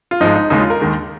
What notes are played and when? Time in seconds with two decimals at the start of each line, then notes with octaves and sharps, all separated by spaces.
0.11 F4
0.20 G#1 G#2 F3 G#3 D#4
0.35 D#4
0.50 D#2 C#3 G#3 D#4
0.60 F4
0.70 A#4
0.80 D#2 D#3 G#3